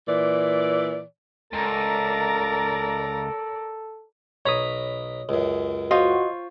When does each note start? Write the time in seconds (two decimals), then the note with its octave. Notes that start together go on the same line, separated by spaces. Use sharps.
0.08 A#2 E3 D5
1.53 C#2 A4 A#4 D5 A#5 A6
4.46 B1 C#5 A#5 B5 D#6
5.29 C#2 F#2
5.91 F4 F#4 C5 C#5 D#5